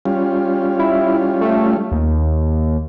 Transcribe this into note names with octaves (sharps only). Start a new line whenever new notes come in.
G3 C#4 F4
E4
A3
D#2